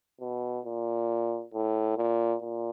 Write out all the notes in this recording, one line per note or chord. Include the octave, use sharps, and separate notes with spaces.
B2
A#2
A2
A#2
A#2